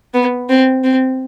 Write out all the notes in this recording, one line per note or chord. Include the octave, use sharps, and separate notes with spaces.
B3
C4
C4